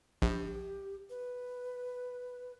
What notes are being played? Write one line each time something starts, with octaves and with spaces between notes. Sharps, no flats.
A#1 G4
B4